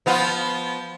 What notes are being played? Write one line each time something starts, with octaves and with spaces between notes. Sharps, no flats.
F3 B3 F4